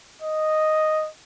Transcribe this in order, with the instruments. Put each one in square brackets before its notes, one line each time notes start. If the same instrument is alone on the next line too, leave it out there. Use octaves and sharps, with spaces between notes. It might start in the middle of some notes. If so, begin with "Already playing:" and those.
[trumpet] D#5